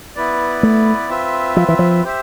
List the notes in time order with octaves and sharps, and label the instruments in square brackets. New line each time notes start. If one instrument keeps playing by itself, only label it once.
[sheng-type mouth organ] B3 E4 B4 D5
[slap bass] A3
[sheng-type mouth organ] C4 F4 B4 E5
[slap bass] F3
E3
F3
[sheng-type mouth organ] G4 C5 E5